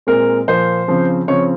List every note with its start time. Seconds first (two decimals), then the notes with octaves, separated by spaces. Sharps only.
0.07 A#2 G#3 C4 A#4
0.47 A#2 F3 A#3 C5
0.88 C#3 F3 C4
1.27 C#3 F3 C4 C#5